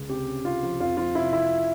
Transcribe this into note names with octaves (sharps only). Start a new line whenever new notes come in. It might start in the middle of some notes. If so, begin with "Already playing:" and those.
Already playing: C#2
C3 G4
C#4
C3 F4
F3
F2 F4
F3 F4
C3 E4
F2 E4